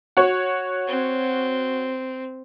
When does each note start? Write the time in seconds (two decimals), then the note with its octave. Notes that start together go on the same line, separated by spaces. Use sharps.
0.17 F#4 C#5
0.87 C4